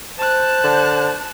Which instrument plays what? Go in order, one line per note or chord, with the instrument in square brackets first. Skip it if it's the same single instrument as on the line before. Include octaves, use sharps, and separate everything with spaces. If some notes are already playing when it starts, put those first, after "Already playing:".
[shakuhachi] C5 [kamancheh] A5 F#6
[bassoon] D3